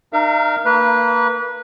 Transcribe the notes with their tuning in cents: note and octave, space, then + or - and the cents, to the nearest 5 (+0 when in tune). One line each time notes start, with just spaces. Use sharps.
D#4 -35 A#4 +0 F5 -45
A#3 -20 B4 -20